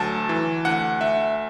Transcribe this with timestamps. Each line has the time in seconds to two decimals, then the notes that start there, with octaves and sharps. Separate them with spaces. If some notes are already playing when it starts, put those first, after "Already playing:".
Already playing: D2 F#3 A5
0.29 E3
0.65 D2 F#5
1.01 D2 E5